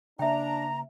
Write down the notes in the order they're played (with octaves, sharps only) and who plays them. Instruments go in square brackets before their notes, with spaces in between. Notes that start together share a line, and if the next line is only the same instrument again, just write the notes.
[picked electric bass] C#3 A#3 [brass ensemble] D4 [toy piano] E5 G5 [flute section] A#5